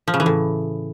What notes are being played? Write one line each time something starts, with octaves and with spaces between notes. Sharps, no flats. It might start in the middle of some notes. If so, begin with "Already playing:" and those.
F3
C#3
E3
A2